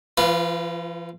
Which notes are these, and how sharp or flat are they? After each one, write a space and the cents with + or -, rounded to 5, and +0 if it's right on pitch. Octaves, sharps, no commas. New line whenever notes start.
F3 -45 F4 +0 B4 +0